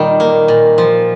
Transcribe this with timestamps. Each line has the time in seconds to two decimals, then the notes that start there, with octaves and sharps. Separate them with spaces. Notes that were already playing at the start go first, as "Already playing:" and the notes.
Already playing: A#2 D#3 G3
0.20 A#3
0.48 A#2
0.78 F3